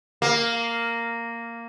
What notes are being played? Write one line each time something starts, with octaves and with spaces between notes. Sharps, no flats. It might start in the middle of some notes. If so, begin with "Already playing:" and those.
A#3